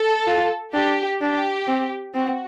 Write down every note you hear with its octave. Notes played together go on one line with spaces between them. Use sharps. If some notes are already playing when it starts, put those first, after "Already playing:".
Already playing: A4
F4
D4 G4
D4 G4
C4
C4 F#4